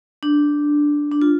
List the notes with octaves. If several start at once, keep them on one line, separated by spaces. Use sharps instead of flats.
D4
D4
F4